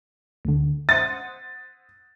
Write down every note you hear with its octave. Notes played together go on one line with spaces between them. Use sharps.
D2 D3
C5 F#5 D#6 A6